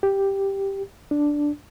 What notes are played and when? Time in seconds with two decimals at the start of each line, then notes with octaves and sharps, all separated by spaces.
0.03 G4
1.11 D4